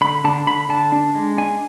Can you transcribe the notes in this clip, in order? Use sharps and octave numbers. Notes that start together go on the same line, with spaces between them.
D3 B5
D3 A5
D3 B5
D3 A5
D4
G#3
D4 G#5